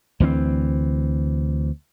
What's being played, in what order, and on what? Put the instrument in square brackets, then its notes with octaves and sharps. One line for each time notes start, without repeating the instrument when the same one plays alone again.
[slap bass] D2 E3 F3 C4